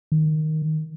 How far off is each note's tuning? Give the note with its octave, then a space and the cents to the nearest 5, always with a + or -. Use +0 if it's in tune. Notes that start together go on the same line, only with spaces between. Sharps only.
D#3 +0